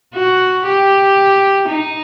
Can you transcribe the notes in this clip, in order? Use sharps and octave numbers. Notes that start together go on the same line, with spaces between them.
F#4
G4
D#4